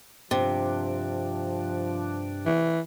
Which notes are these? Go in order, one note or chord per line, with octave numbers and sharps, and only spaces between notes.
G2 C3 F3 D4
E3